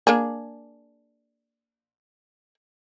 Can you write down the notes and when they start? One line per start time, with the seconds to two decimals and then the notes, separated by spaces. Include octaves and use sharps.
0.07 A#3 D4 G#4